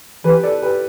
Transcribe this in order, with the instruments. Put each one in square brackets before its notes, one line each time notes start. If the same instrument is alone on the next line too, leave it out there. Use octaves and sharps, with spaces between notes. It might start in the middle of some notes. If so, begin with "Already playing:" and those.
[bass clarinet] E3 [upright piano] G4 B4
[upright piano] A4 D5
G4 B4